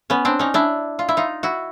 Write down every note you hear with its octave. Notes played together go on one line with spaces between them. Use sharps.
B3 C#4
C4 D4
C#4 D#4
D4 E4
F4
E4
D#4 F4
E4 F#4